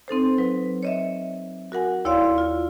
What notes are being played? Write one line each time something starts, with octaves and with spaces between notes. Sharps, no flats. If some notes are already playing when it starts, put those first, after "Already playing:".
C4 D#4 A4 C5
F#3 B4
C#5 D#5 E5
F#4 A#4 F#5 G#5
D#2 E4 C#5 D5 F5 C6
F4